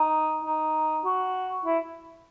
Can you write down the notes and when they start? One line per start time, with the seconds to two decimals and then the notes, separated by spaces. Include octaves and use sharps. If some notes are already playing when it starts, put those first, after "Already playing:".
Already playing: D#4
0.44 D#4
1.05 F#4
1.65 E4